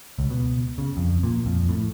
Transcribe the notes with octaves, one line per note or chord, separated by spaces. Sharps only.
C#2
B2
C#3
F2
A#2
F2
A2